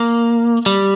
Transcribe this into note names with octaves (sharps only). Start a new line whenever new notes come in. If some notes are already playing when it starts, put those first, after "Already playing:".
Already playing: A#3
G3